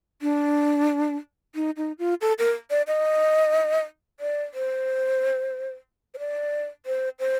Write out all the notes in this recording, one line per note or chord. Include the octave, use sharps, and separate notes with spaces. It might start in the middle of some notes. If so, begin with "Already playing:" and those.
D4
D#4
D#4
F4
A4
A#4
D5
D#5
D5
C5
C5
D5
C5
C5